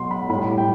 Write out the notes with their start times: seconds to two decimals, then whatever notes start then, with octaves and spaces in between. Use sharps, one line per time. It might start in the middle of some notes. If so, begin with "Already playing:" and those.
Already playing: B2 F#3 C6
0.11 B5
0.29 A2 G3 B5
0.58 G5